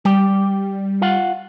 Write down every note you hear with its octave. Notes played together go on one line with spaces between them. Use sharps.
G3 G4
F4 F5 F#5